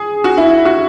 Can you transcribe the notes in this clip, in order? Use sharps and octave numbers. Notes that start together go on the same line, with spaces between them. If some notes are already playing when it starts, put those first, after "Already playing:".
Already playing: G#4
F#4
E4
F#4